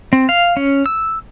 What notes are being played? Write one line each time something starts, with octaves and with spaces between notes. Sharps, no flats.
C4
F5
C#4
E6